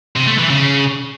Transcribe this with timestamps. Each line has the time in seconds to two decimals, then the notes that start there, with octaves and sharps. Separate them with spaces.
0.16 C3
0.28 A3
0.39 E3
0.50 C#3